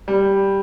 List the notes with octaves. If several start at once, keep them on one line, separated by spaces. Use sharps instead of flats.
G3